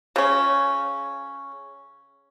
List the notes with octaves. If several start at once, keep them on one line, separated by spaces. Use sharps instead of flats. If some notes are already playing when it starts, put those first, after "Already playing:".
C#3 C#4